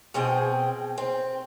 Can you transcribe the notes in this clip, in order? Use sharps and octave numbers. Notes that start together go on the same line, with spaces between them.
B2 F3 C4 G#4 G5
C4